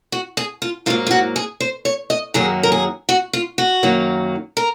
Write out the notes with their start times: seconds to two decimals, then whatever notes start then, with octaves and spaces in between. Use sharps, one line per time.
0.12 F#4
0.37 G#4
0.62 F4
0.86 G#2 F#3 A#3 F4
1.07 F4
1.11 F#4
1.36 G#4
1.60 C5
1.85 C#5
2.10 D#5
2.34 F#2 D#3 F#3 A#3 G#4
2.63 A#4
2.72 G#4
3.09 F#4
3.33 F4
3.58 F#4
3.83 F#2 D#3 F#3 A#3
4.57 A#4